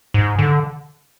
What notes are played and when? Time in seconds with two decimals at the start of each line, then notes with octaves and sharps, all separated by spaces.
0.14 G#2
0.39 D3